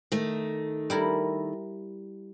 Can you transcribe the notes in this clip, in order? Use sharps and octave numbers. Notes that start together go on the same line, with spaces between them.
D#3 A3
G3 E4 A#4